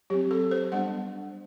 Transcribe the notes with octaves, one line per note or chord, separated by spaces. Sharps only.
F#3 C4 G4
A4
C5
G3 B3 D4 F#5